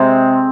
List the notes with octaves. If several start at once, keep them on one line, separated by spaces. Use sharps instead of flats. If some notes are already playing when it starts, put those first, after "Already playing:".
Already playing: C3 G#3 C4